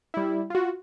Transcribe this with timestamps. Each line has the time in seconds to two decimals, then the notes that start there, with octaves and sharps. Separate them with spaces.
0.14 G3 E4
0.50 F4 F#4